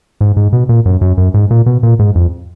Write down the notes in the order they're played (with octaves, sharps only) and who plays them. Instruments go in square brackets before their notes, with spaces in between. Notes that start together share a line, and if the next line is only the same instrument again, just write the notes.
[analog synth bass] G#2
G#2
B2
A#2
F#2
F#2
F#2
G#2
A#2
B2
A#2
G#2
F2